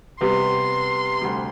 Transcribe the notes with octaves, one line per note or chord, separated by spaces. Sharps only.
C3 G3 B3 C6
D2 C3 G3